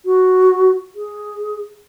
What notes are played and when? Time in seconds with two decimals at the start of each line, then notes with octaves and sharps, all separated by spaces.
0.06 F#4
0.95 G#4